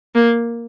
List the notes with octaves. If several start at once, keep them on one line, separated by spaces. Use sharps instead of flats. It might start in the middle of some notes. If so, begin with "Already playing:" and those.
A#3